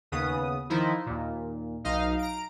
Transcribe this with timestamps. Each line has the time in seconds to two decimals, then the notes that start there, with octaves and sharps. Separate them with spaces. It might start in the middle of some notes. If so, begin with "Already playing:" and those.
0.12 D#2 C#3 B3 D#6
0.70 D#3 F3 D#4 E4
1.06 D#2 A#2
1.84 B1 D#4 D#5 F5
2.19 A#5 D7